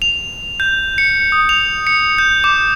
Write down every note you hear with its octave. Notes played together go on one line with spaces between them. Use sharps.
F7
G6
C#7
D#6
F7
C#7
G6
D6